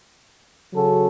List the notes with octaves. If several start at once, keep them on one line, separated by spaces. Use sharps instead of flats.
C#3 F#3 C#4 F#4 A4